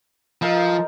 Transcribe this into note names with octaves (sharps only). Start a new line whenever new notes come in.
F3 D#4 A4 A#4